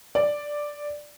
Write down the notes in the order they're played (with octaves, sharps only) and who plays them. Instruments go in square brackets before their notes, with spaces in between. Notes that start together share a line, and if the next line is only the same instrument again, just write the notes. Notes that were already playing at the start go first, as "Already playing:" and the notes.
[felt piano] D5